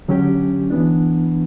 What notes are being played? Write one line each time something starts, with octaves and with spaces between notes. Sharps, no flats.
D3 F#3 C#4 G4
E3 B3 D4